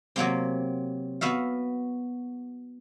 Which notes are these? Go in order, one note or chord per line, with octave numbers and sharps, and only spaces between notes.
C3 F#3 A#3 C4
B3 F#4 E5 F5